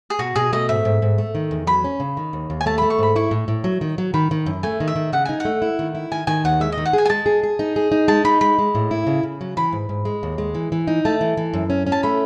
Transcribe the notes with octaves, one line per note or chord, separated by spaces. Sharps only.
G#4
B2 F#4
B2 G#4
A3 D#5
G#2 E5
G#2
G#2
A3
D#3
E2
F#3 B5
C#4
C#3
D#3
D#2
D#2
G#5
A3 A5
A3 B5
C#6
G#2 B5
E4 C#6
A2
A2
F#3
D#3
F#3
D#3 B5
D#3
F#2
A3 G#5
D#3
E5
D#3
C#3 F#5
D#4 G#5
F#5
A3
E4
D#3
E4
D#3 G#5
D#3 G#5
D#2 F#5
G#3 E5
D#5
D#3
F#5
G#4 G#5
G#5
G#3 A5
G#4
G#4
D#4
G#4
D#4
G#3 A5
D#4 B5
G#3 B5
G#3
A2
E4
C#3
C#3
F#3
E3 B5
G#2
G#2
G#3
D#2
G#3
E3
E3
D#4
A3 A5
E3
E3
F#2
C#4
C#4
A5
A3 B5